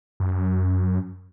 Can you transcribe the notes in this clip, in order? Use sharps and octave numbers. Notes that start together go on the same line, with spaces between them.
F#2